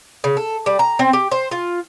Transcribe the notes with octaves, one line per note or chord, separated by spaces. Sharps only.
C#3
A4
G3
A#5
C4
G4
C5
F4